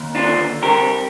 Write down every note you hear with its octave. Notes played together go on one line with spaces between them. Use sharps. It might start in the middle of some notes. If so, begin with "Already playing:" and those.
Already playing: D#2
D4 F4
D3
C2 G4 A#4